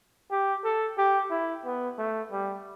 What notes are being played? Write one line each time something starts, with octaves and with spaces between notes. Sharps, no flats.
G4
A4
G4
E4
B3
A3
G3